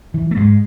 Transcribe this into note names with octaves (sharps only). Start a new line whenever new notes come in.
E3
A3
G#2 G#3